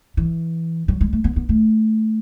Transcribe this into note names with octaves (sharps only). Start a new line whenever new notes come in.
E3
F#3
G#3
A3
B3
B3
A3